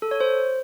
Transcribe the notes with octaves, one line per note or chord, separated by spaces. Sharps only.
A4
C#5
C5